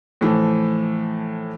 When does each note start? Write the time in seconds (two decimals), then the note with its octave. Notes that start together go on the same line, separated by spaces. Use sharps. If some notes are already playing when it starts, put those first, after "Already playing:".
0.21 A2 E3 F3